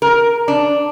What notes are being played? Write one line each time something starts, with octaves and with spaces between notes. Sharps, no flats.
A#4
D4